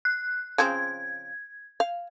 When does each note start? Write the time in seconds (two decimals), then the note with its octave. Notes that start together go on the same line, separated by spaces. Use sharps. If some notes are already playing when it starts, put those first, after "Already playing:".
0.05 F#6
0.58 C#3 F3 C4 G#6
1.80 F5